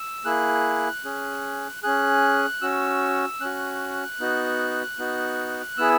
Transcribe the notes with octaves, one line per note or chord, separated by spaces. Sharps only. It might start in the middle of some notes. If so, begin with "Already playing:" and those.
Already playing: E6
A#3 E4 G#4 F#6
C#4 G#4
C#4 G#4 F#6
C#4 F#4 E6
C#4 F#4 F#6
B3 D#4 F#4
B3 D#4 F#4
B3 E4 G#4 E6